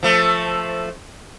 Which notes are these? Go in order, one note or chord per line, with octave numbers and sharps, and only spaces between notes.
F3 A3